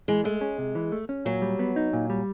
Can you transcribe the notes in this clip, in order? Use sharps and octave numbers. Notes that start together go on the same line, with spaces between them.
E3 G#3
G#3 A3
C#4
C3
E3
A3
C#4
A#2 F#3
G3
B3
D#4
A#2
G3